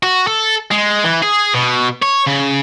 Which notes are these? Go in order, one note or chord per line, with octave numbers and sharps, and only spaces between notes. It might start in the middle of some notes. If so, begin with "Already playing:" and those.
F#4
A4
G#3
E3
G#4
B2
C#5
C#3